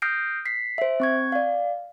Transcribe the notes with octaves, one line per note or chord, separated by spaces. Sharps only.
D#6 F6 G6 A#6 C7 D7
B6 C7
C5 E5
C4 C#6 G#6
D5 F5